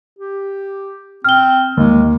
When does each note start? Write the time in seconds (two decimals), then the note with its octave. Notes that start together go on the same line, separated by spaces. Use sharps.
0.19 G4
1.24 C4 F6 G7
1.77 D#2 G#3